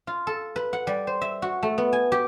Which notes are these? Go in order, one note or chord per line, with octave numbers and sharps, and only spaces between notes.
F4
A4
B4
F#5
G3
C5
E5
F#4
A3
B3
G#5
G4